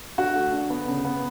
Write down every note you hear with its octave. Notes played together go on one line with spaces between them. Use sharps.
D3 F#4
A3
D3
B3
C#3
B3